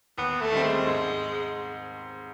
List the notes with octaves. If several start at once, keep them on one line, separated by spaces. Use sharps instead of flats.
D#2 B3
A3
D#3 G3 C4
G#3
G#2